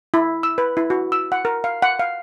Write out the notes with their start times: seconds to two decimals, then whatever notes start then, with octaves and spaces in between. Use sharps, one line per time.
0.14 E4
0.43 E6
0.58 B4
0.77 E4
0.90 F#4
1.12 E6
1.32 F#5
1.45 A#4
1.64 F5
1.82 F#5
1.99 F5